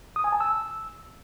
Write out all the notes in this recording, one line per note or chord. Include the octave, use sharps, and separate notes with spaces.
D#6
G#5
A5
E6